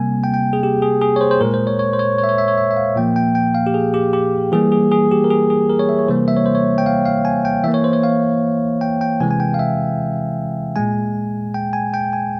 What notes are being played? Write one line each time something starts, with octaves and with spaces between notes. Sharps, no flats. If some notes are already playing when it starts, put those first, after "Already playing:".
Already playing: C3 G3 A#3 G#5
G5
G5
G#4
G4
G#4
G#4
C#5
C5
C5
A#2 G#3 A#4
C5
C#5
C#5
C5
C#5
C#5
E5
C#5
E5
C#5
E5
E5
F5
A#2 F3 A#3 G5
G5
G5
F5
G4
G#4
G4
G4
E3 G3 A#3 G#4
G#4
G#4
G4
A#4
G#4
G#4
A#4
C#5
E5
C#5
C3 E3 G3 A#3 C5
E5
C#5
C5
C#5
G5
F5
F5
G#5
G5
E3 A#3 E5
C#5
C5
C#5
F5
G5
G5
C3 E3 G#3 G#5
G#5
G5
F5
E5
A#2 G#3 G#5
G5
G#5
G5
G#5